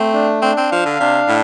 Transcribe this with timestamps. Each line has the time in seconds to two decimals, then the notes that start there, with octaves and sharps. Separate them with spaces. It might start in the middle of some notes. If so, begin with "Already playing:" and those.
Already playing: A3 C4
0.14 D4
0.42 C4 D4
0.57 C4
0.71 F3 F5
0.86 D3
1.00 C3 D4
1.28 A2